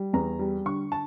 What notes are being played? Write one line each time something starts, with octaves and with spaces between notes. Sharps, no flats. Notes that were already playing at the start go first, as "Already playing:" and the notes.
Already playing: G3
E2 A#5
G3
D3 C#6
A5